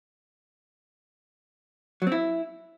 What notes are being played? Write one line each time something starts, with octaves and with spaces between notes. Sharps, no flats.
F#3
C4
E4